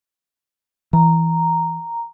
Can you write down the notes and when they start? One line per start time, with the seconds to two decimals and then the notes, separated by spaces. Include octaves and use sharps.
0.93 E3 A#5